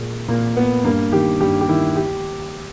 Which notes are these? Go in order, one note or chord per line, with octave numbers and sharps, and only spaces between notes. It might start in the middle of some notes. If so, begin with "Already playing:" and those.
Already playing: A#2 G#3
A#2 A#3
B3
G2 A#3
D#3 G4
G2 G4
G4
D#3 E4
G4